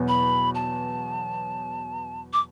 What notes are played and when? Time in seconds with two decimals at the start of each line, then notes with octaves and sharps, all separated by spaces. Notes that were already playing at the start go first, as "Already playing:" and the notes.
Already playing: E2 B2 F#3 B3
0.08 B5
0.55 A5
2.33 D6